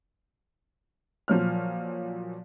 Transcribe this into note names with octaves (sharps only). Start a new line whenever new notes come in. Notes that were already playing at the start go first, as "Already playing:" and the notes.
A#2 F3 F#3 F6